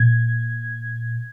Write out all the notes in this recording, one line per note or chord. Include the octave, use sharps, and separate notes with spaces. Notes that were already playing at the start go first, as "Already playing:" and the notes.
Already playing: A#2 G#6